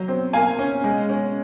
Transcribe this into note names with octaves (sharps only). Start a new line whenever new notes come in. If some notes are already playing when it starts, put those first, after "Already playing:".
Already playing: F#3
C4
A#3 F5 G#5
C#4
G#3
C#4